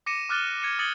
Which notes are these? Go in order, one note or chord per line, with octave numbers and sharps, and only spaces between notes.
D6 A#6 C#7 D#7 E7
D6 F6 F#6 A6 D#7 G7
G#6 C#7 D#7
D#6 G#6 A6 C#7 F#7 G7